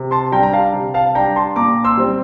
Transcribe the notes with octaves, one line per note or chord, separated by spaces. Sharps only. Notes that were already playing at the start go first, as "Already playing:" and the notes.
Already playing: C3
A5 C6
G3 D4 G5 A#5
A#5
F5 A5
C3
F5 A5
G3 D4 G5 A#5
A5 C6
A#2 A#5 D6
C6 E6
G3 C4